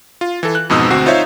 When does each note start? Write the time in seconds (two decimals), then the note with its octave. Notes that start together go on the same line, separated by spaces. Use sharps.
0.21 F4
0.43 E3 A4
0.55 F#6
0.70 F2 G#2 B2 D#4 D#6 E6
0.91 D2 C4 F#4 C7
1.06 D#4 F4 C5 C#5 E5 F5